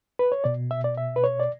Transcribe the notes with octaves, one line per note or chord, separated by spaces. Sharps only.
B4
C#5
B2 D5
E5
D5
E5
B4
C#5
D5